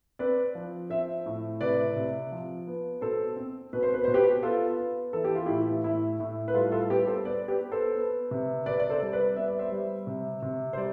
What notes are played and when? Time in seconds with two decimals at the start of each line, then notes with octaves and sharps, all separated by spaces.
0.19 C4 B4 D5
0.55 F3
0.90 C4 C5 E5
1.26 A2
1.61 C3 B4 D5
1.96 C3
2.31 F3
2.67 B3
3.01 B2 A4 C5
3.37 C4
3.73 B2 B4
3.83 C5
3.94 B4
4.04 B2 C5
4.14 G4 B4
4.43 B3 F4 A4
4.78 B3
5.13 E3 A4
5.24 G4
5.35 F4
5.46 A2 E4 G4
5.84 A2 E4
6.20 A2
6.48 B4
6.54 G3 F4 A4
6.72 F4 A4
6.89 B3 G4 B4
7.07 A4 C5
7.25 B3 B4 D5
7.48 G4 B4
7.60 B3
7.72 A4 C5
7.95 B3
8.31 C3
8.66 C3 B4 D5
8.80 D5
8.89 A4 C5
9.02 G3
9.13 B4 D5
9.36 B3 E5
9.48 D5
9.59 C5 E5
9.72 G3
10.07 C3
10.42 C3
10.73 C5
10.77 G3 D5